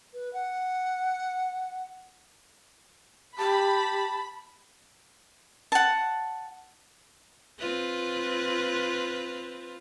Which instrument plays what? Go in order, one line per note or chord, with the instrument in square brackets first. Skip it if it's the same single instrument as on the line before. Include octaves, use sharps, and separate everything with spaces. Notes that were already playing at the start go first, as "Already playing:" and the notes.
[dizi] B4
F#5
[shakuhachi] G4 [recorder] A5 [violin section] B5
[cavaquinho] F#5 A5
[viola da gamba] C4 F4 B4